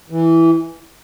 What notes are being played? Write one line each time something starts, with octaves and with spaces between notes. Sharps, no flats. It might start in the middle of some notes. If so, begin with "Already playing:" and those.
E3